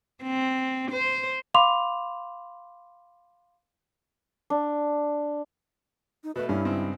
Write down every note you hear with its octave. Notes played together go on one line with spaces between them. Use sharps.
C4
C5
F5 B5 C6 D6 F7
D4
D#4
B2 A3 B4
G2 C#4 E4
C#2 C4 D#4